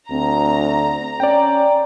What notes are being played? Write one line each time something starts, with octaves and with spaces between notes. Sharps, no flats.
D2 C4 A#5
C#4 D5 G5 A#5